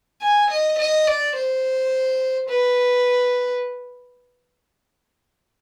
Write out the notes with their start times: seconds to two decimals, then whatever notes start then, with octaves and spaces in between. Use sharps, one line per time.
0.22 G#5
0.51 D#5
0.78 D#5
1.07 D5
1.35 C5
2.49 B4